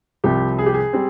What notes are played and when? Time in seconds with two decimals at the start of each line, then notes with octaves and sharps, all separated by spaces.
0.24 C2 C3 F3 C4 G4
0.59 G#4
0.66 G4
0.74 G#4
0.93 G3 C4